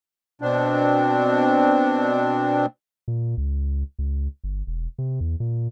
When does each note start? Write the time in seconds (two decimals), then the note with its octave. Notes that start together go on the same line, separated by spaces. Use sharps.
0.41 B2 C4 D4
3.08 A#2
3.37 C#2
3.99 C#2
4.44 G1
4.67 E1
4.98 C3
5.21 E2
5.40 A#2